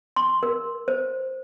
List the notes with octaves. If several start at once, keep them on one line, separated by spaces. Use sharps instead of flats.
C6
A#4
C5